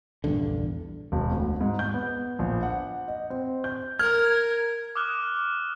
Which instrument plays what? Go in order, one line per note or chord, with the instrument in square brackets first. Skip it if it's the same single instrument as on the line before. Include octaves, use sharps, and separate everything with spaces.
[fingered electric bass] A#1 E2 G2 D3
[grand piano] E1
D2
G#2
G6
B3
A#1
F#5
D#5
C4
G6
[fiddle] A#4 [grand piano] F6 [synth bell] G#6
[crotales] D6 D#6 F6 F#6